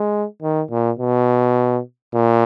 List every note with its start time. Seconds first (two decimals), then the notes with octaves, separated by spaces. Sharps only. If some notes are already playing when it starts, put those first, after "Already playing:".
Already playing: G#3
0.42 D#3
0.71 A#2
0.99 B2
2.14 A#2